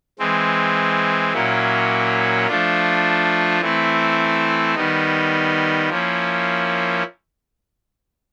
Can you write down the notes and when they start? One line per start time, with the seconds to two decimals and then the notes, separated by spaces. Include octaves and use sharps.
0.19 E3 G#3 C4
1.33 A#2 F#3 A#3 C#4 E4
2.47 F3 A3 D4 F4
3.61 E3 A3 C4 E4
4.75 D#3 G3 B3 D#4
5.89 F3 A#3 C#4 E4